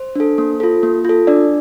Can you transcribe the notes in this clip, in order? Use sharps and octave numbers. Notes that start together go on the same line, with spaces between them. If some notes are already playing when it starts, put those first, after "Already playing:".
Already playing: C5
D4 A4
A#3
F4 A4
A#3
F4 A4
D4 D5